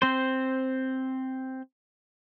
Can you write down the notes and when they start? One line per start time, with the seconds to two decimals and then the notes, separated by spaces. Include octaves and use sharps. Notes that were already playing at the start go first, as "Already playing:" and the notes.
0.02 C4 C5